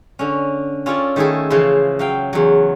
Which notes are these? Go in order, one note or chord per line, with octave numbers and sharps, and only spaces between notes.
D3 C#4
C#4 F4 A4 D5 G#5
D#3 A3 E4 G#4 A4
C#3 E3 F3 A4 C5 C6
F#3 F5 G5
E2 F#3